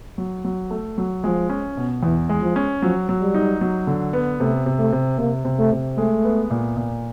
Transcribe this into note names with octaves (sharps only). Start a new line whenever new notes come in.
F#3
F#3
A3
F#3
F3 G#3
C#4
B2
E2 E3
G#3
F3
C#4
F3 F#3
F#3
G3
D#4
F#3
D3
B3
C3 A3
C3
A3
C3
C3 A#3
C3
A3
C3
G#3 A3
B3
A#2
A#2